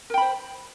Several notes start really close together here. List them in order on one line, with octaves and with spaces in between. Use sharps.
A#4 G5 B5 C5